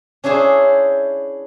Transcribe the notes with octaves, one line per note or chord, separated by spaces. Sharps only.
C#4 D4 E4 G#4 C5